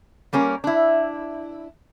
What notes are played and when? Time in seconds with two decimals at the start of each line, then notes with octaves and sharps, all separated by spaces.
0.33 G3 A#3 C#4 A#4
0.64 D4 E4